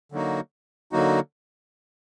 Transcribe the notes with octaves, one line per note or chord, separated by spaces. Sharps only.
D3 F#3 A#3 D#4 F#4
D3 F#3 A#3 D#4 F#4